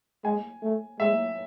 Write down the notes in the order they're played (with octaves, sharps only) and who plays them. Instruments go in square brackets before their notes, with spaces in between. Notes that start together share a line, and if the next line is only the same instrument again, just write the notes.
[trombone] G#3 [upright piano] G#5
[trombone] A3
[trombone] G#3 [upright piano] E5